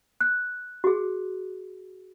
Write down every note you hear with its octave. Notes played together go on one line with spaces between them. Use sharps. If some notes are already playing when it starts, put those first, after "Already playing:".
F#6
F#4 G#4